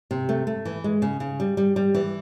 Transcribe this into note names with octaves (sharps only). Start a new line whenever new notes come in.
C3
A3
A3
E3
G#3
C#3
C#3
G3
G3
G3
E3